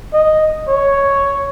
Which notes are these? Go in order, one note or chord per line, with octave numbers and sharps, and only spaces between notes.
D#5
C#5